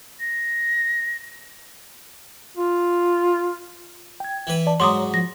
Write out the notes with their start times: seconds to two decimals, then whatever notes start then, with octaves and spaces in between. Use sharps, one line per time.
0.20 A#6
2.57 F4
4.20 G5 G#6
4.47 E3 B4
4.67 D5 A5
4.80 G#2 F#3 C#5 A#5 C6 D6 D#6
5.14 F3 A#6